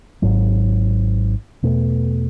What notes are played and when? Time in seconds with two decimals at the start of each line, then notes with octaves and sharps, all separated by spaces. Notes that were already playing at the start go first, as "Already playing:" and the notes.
0.22 G#1 G#2 F#3
1.62 E2 B2 A3